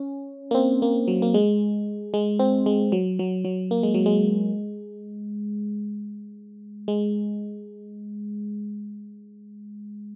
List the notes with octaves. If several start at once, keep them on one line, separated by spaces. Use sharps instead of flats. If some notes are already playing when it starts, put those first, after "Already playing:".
Already playing: C#4
A#3
C4
A#3
F#3
A#3
G#3
G#3
C4
G#3
F#3
F#3
F#3
A#3
G#3
F#3
G#3
G#3